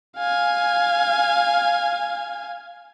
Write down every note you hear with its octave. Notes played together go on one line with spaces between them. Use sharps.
F5 G#5